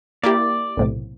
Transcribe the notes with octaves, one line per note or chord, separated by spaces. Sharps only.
A#3 E4 G4 D5
B1 A2 C3